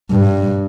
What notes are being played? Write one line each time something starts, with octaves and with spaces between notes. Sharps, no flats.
G2